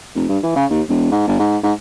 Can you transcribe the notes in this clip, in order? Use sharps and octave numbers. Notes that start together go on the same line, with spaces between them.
F1
G2
E3
C#3
D#2
E1
G#2
G1
G#2
G#2